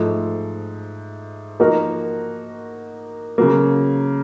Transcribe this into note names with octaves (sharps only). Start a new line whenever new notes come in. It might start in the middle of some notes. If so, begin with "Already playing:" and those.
Already playing: G#2 F3 A3
F3 A#3 D#4 F#4 A#4
C#3 F#3 A#3